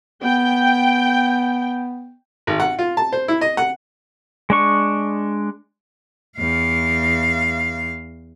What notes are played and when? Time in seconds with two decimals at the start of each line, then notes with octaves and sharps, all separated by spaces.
0.24 B3 G5
2.47 G#1
2.60 F#5
2.79 F4
2.97 A5
3.12 C5
3.28 E4
3.41 D#5
3.57 F#5
4.50 G#3 D4 C#6
6.37 E2 F5